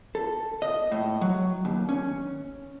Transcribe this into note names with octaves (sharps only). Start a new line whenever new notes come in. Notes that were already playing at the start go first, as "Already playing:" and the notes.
A4
D#5
A2
F#3
D#2
C#4